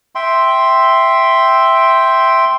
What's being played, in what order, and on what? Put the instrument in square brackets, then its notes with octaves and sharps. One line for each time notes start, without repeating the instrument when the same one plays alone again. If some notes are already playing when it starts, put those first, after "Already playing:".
[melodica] E5 G5 C6